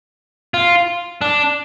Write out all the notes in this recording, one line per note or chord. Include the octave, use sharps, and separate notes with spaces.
F4
D4